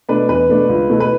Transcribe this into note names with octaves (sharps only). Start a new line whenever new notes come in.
B2 A3 D4 B4
E2 B4
B2 A3 D4
C#2
B2 A3 E4
B4